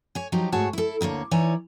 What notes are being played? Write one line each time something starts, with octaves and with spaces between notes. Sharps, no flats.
C#5 G#5
F3 F#3 D#4 G4
G#2 A3 F#4 G#4 C#5 A5
E4 A4
D2 D3 A#3 C#5
E3 D#4 C#5 D5 G#5